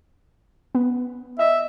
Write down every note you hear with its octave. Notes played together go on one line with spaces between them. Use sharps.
B3
D#5 E5